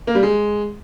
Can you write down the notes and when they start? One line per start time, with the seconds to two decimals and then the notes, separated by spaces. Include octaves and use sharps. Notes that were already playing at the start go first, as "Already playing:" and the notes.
0.07 A#3
0.15 G3
0.23 G#3